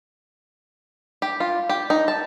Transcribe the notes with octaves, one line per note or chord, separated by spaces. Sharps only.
G4
F4
G4
D#4
A5